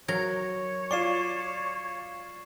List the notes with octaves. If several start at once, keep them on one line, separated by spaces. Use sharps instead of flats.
F#3 A#4 C#5 G#6
F4 D5 C#6 C7 E7